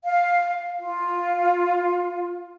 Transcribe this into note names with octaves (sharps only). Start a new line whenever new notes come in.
F5
F4